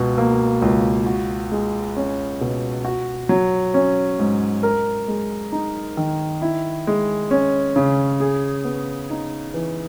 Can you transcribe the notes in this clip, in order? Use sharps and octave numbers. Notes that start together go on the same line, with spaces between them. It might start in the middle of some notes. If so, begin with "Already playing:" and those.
Already playing: C#2 B2
A#3
C#2
F#4
G#3
C#4
B2
F#4
F#3
C#4
G#2
A#4
G#3
D#4
D#3
E4
G#3
C#4
C#3
G#4
B3
D#4
E3